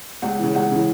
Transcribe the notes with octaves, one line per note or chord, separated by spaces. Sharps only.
C#2 F#5
C#3 E3
C#2 F#5
C#3 E3